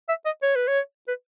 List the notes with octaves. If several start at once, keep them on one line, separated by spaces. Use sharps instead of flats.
E5
D#5
C#5
B4
C#5
B4